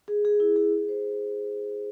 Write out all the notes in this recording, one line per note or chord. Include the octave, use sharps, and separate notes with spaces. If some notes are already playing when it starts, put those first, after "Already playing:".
G#4
G#4
E4
G#4
G#4
C5